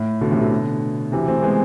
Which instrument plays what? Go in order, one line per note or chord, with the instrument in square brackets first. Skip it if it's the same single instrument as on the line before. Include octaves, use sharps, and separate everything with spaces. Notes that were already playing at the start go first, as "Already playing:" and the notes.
Already playing: [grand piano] A2
B2 D3
A2 C3
B2 D3
C3 E3
A3 C4
G#3 B3